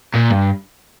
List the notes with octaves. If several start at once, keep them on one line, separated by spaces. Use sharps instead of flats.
A#2
G2